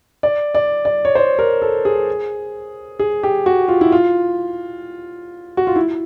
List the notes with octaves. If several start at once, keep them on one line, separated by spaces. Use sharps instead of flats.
D5
D5
D5
C#5
C5
A#4
A4
G#4
G#4
G4
F#4
F4
E4
F4
F#4
F4
E4